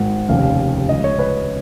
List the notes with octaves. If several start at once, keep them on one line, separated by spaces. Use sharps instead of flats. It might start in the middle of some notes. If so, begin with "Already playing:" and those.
Already playing: G#1 G#2 D#3 F#5
F1 D#2 C#3 F5
C#2 C#3 D#5
C#5
B4